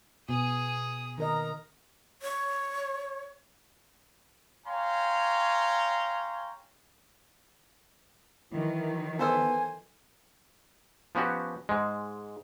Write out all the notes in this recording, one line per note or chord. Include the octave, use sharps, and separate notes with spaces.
B2 G#4 D#6
D#3 A#4 D#5 A#5
C#5
C#5 F5 G5 G#5 A#5 C6
D#3 E3 F#3 E4
B3 A4 C5 G#5 E6
F3 B3 C#4 F#4 G4
G#2 G#3